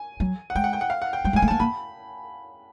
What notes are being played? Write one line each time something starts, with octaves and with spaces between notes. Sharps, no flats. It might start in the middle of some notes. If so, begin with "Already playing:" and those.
Already playing: G#5
F#3
F#5
G#3 G5
F#5
G5
F#5
F5
F#5
G5
G3 G5
G#3
G#5
A3
A#3 A5
A#3 B5